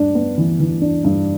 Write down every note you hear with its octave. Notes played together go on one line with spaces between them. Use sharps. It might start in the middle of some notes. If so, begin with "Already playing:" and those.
Already playing: G2 D4
B3
E3
E3
D4
G2